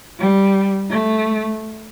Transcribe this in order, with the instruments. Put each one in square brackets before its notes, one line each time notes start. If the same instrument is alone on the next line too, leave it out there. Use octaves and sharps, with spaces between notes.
[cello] G3
A3